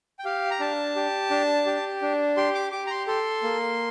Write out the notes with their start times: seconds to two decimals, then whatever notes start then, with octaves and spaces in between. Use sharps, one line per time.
0.19 G5
0.25 G4 F5
0.51 A#5
0.60 D4 A5
0.96 G4
1.31 D4
1.66 G4
2.02 D4
2.37 G4 C6
2.55 D6
2.72 G4 D6
2.87 A#5
2.91 C6
3.07 A4 C6
3.43 A#3